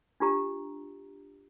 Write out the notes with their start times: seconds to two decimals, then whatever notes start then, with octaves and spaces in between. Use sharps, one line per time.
0.20 D4 F4 G4 A#5